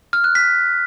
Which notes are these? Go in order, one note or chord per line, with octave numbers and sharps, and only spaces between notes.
F6
F#6
B6